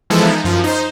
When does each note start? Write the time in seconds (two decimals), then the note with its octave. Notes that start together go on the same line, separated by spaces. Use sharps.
0.10 E3 F3 G#3 B3 E4 A4
0.26 D#4
0.44 F#2 F3
0.64 D#4 C5